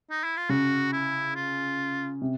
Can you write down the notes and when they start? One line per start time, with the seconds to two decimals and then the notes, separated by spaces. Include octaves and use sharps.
0.10 D#4
0.24 E4
0.37 F4
0.49 C#3 F#4
0.93 E4
1.35 F4
2.22 C3